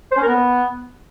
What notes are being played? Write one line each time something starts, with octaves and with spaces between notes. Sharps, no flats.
C5
C#4
A#4
B3